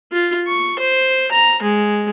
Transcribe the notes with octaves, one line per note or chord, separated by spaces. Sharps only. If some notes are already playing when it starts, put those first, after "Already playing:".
F4
C#6
C5
A#5
G#3